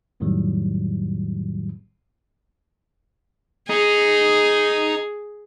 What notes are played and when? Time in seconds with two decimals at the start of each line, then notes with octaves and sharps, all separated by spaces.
0.20 B1 F2 A2 D#3 F#3 G3
3.69 D#4 G#4